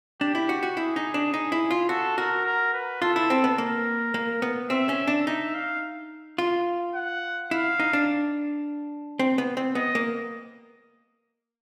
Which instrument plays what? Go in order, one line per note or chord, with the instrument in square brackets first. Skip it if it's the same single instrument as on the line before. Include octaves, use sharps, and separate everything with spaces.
[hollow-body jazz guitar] D4 [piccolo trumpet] G4
[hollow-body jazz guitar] E4
F#4
F#4
[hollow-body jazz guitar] E4 [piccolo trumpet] G#4
[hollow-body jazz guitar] D#4
D4
D#4
E4
F4
[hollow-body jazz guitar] F#4 [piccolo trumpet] A4
[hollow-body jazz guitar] F#4 [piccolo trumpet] A#4
[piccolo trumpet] A#4
B4
[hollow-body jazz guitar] F4 [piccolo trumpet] A4
[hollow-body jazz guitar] E4
C4
B3
[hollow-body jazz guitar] A#3 [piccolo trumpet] A#4
[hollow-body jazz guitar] A#3
B3
[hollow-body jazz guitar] C4 [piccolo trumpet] E5
[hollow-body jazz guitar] C#4
D4
[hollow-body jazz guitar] D#4 [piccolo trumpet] E5
[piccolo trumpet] F5
[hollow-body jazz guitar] F4
[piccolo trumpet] F#5
[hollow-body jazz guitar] E4 [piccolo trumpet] F5
[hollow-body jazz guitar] D#4
D4
C4
B3
C4
[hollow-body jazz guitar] B3 [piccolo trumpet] D#5
[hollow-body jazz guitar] A#3